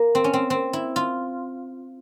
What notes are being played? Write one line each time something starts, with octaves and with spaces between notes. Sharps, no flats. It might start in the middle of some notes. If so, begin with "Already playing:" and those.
Already playing: A#3
C4
C#4
C4
C4
E4
F4